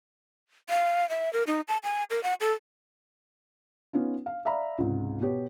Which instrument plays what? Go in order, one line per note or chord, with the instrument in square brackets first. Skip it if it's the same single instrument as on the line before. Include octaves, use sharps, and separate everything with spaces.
[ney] F5
E5
A#4
D#4
A5
G#5
A#4
F#5
A4
[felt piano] B3 C#4 D#4 F4
F5
D5 E5 F5 A#5 B5
C#2 G#2 C3
B2 B3 G4 C#5